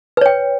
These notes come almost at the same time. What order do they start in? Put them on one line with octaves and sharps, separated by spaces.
B4 C#5 G5